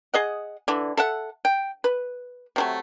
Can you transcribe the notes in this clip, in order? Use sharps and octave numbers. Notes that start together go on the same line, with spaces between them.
G#4 D#5 F#5
D3 E3
A4 E5 F#5
G5
B4
C3 F#3 A3